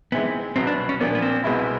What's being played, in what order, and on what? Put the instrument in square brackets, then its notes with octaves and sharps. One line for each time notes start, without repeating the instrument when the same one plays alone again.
[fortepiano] C3 E3 G#3 C4 D#4 [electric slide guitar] B3
[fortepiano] C2 B2 F#3 B3 [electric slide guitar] C4
[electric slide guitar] D4
C#4
[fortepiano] A#2 F3 A#3 D4 [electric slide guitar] B3
[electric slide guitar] B3
C4
[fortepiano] C2 B2 G#3 B3 E4